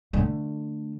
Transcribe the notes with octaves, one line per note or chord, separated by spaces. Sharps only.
D3 A3